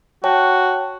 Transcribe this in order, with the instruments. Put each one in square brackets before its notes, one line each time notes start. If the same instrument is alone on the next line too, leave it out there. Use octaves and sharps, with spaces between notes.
[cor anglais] F#4 [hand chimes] C#5 G5 A5